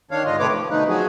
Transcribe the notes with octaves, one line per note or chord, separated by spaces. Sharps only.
D#3 D4 C#5 F5
G#2 D3 F4 D#5
C3 D#3 A3 B4 C#5 D6
F3
B2 D3 A3 D#4 B4
F3 F#3 F#4 G#4